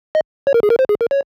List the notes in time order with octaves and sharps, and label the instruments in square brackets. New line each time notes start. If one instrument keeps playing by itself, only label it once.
[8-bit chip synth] D#5
C#5
A#4
G#4
A#4
C5
G#4
A#4
C#5